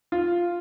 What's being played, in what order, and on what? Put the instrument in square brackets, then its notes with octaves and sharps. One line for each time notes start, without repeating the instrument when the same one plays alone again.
[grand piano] F4